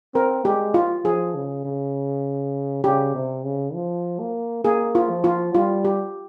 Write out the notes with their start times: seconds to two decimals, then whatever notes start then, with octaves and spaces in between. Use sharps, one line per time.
0.14 C4 A#4
0.44 G#3 G4
0.74 F4
1.05 F3 G#4
1.35 C#3
1.65 C#3
2.84 C#3 G4
3.15 C3
3.45 C#3
3.74 F3
4.20 A#3
4.64 A#3 G#4
4.95 F4
5.09 F3
5.24 F4
5.54 G3 F4
5.85 G4